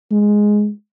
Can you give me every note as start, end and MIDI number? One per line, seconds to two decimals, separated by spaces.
0.11 0.70 56